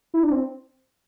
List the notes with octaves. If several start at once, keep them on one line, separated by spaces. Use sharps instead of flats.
E4
D4
C4